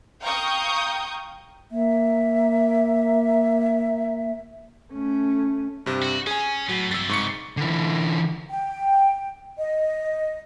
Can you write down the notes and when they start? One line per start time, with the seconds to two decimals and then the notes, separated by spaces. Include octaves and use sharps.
0.23 F5 G5 A#5 C#6 D#6 G6
1.71 A#3 E5
4.92 A3 C#4
5.86 G2 C3
6.02 F#4
6.27 C#4 G#4 G#5
6.69 A2 F#3
6.91 G2 C3 E6 A6
7.09 G#2 C#6 C#7
7.57 D3 E3
8.50 G5
9.58 D#5